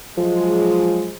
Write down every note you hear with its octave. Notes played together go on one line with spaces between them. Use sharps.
F3 F#3 G#3